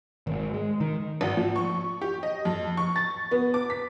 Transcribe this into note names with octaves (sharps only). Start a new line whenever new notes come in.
G#1
G#3
D#3
G#1
F3
C#6
G4
D#5
F2
C#6
A6
B3
D6
B6